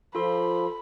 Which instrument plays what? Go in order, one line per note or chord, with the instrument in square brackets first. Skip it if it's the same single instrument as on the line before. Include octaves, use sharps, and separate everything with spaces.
[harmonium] F3 [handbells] F4 A4 C6 [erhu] B5